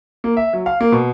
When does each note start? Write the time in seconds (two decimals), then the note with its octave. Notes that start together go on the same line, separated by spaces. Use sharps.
0.24 A#3
0.37 E5
0.53 F#3
0.66 F5
0.80 A#3
0.92 B2